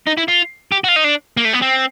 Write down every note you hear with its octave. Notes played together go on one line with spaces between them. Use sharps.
D#4
E4
F4
G4
F#4
F4
D#4
D4
A#3
A3
B3
C4